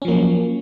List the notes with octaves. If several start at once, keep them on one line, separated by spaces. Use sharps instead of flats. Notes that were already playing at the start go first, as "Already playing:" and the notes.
F3 F#3 A#3 C#4